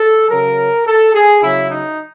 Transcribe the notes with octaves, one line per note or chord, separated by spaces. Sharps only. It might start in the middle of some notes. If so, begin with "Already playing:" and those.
Already playing: A4
C#3 F#3 A#4
A4
G#4
C#3 F#3 E4
D#4